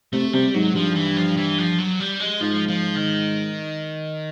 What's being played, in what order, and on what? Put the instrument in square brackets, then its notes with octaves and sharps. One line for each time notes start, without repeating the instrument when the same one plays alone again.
[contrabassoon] C3 [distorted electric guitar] A3
[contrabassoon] C3 [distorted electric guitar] G3
[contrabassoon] G#2 [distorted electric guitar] F#3
[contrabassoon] G2 [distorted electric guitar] F3
[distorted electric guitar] E3
F3
E3
F3
F#3
G3
G#3
[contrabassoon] G#2 [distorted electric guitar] F3
[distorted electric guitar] F3
D#3